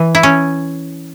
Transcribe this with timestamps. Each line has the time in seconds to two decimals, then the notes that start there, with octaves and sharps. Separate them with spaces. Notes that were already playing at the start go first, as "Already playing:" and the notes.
Already playing: E3
0.15 E4
0.23 C#4